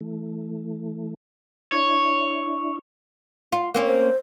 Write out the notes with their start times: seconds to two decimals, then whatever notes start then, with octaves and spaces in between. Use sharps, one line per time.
0.01 E3 A3
1.72 D4 E4 C#5
3.52 F4
3.74 A#3 C4 C#4
3.86 C5